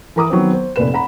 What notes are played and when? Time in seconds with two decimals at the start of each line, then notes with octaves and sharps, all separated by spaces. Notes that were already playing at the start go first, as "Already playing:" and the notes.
0.16 E3 A#4 A#5 D6 D#6
0.30 D#3 F#3 B3 C4
0.53 C5
0.76 F1 A#2 B4 E7
0.94 F#5 A#5 B5